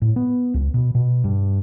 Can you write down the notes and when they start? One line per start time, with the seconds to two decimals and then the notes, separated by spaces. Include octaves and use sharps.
0.02 A2
0.16 B3
0.54 C#2
0.74 B2
0.95 B2
1.24 G2